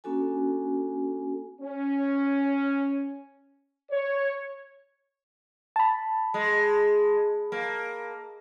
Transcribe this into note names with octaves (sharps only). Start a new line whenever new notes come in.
A#3 C#4 D4 F#4 A4 G#5
C#4
C#5
A5 B5
G#3
A#3